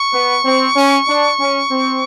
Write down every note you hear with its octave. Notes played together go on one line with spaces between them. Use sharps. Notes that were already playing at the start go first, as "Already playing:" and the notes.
Already playing: C#6
B3
C4
C#4
D4
C#4
C4